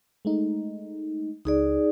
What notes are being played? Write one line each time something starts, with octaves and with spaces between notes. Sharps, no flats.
G#3 A3 D#4
C#2 D#4 G#4 D5